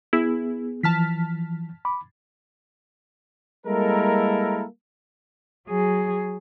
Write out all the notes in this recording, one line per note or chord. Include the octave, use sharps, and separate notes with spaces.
B3 E4 G#4
E3 F3 A5 F6 B6
B5 D6
G3 G#3 A#3 E4 A4 A#4
F#3 G#4